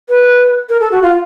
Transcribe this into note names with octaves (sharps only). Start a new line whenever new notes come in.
B4
A#4
A4
F#4
F4